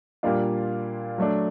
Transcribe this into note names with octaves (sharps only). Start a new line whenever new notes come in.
A#2 G3 A#3 D4 F4
F#3 A3 D4